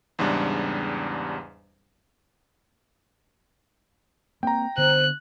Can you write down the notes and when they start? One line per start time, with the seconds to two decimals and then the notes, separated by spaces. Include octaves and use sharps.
0.19 E2 G#2 C#3 G3 D4
4.43 A#3 C4 G5 A#5
4.77 D3 B3 C5 F#6